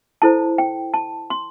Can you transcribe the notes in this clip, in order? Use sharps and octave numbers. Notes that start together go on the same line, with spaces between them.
E4 A4 C5 A5
G5
A5
C6